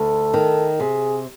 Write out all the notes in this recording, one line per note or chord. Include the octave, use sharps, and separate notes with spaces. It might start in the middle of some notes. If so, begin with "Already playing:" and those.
Already playing: D2 A4
D#3
C3 G#4